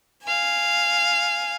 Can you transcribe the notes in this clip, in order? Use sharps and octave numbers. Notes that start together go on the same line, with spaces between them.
F5 G#5